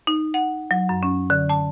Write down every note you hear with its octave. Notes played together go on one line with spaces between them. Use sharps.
D#4
F#5
F#3
F#2
C#4
D3
A5